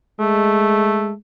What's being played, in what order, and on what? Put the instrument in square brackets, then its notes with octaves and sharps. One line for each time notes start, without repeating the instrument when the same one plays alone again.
[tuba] G#3 [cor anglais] A3